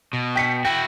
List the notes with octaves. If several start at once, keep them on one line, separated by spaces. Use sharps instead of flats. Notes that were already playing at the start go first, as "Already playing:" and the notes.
B2
G5 B6 C#7
E4 F#4 G5